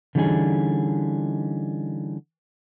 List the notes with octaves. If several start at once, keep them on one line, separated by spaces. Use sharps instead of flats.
D3 E3 G3 C#4 D#4 G#4